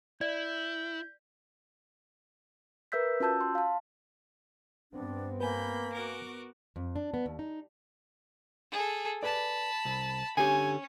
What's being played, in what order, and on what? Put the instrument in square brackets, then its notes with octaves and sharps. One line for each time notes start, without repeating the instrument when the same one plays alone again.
[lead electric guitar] E4 [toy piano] D5 [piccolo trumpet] G6
[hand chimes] A#4 B4 E5 E6 G6 B6
C#4 F4 F#4 A5 E6 G6
C6
F5 A5
[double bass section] G2 B3 C4 [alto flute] D4
[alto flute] A#3 [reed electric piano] B4 G#5 [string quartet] B5 G6
[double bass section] B3 [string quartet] F#4 A#4 D6
[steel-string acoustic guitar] F2
D4
B3
D#2
D#4
[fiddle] G#4 A4
[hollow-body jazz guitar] B4 D5 [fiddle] A5 B5
[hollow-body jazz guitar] C2
[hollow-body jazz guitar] D3 G4 [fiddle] C#4 [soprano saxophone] G#5